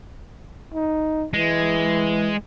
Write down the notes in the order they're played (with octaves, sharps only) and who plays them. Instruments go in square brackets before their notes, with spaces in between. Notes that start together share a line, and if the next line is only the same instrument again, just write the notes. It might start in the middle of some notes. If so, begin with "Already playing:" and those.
[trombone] D#4
[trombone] E3 [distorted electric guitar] G#3